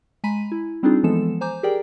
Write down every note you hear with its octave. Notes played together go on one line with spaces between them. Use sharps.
G#3 G#5 A#5 B5 B6 D#7
E4
G3 C4 D4 D#4 F4 G#4
E3 F3 G#3 B3 A4 E7
C5 G#5 A#5 D6 G6
G4 G#4 A#4 D5 G5